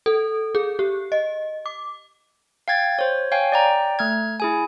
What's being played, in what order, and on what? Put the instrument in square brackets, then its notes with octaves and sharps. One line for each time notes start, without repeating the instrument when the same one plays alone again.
[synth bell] A4
G#4
G4
D#5
D6
[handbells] F5 G5 G#6 A6
C5 C#5
C#5 F5 G5 G#5
D5 G5 A#5
A3 F6 G#6
E4 G#4 G#5